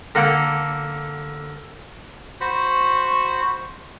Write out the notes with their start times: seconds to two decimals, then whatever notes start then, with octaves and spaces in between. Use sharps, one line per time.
0.15 D3 A#3 A4 F#5
2.41 F#4 C5 B5 C#6